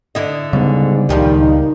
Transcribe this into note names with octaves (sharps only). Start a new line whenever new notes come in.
D3 E4 D#5
G#2 C#3 G3 B3
C#2 A#2 D#3 F3 G3
D#4